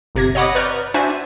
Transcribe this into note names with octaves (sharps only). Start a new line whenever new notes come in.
G1 C3 G#6 A#6
C#5 D#5 F#5 B5 D6 D#6
B4 D5 A#5 C#6 F6 G6
D4 F#4 C5 D5 E5 G#5